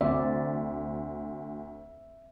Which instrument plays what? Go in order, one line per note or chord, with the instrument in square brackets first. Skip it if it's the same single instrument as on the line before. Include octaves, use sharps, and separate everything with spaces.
[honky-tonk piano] D2 [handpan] C4 D5 [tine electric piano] E5